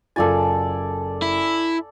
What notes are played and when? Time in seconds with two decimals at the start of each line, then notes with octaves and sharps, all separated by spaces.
0.16 F#1 F4 A4 D5 G#5 A6
1.22 E4